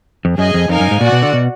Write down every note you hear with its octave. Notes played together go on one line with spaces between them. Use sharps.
F2
F#2 G#4 D#5 G#5
F2
F2 D#4 A#4 F5 G#5
F#2
G#2
A#2 F#4 D5 F#5
B2
D3
B2